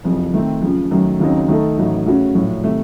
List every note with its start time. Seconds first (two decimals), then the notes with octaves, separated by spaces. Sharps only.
0.04 F#1 F2 C3 F3
0.34 D#3 A3 C4
0.62 F#2 C#3 F3
0.91 F#2 D#3 F#3 A3
1.20 D#2 C#3 F#3 C4 D#4
1.48 D#3 A3 D#4 A4
1.78 A1 A2 F#3 A3 D#4
2.06 C#3 A3 C#4 F#4
2.35 A#1 A2 F#3
2.64 C3 D#3 A3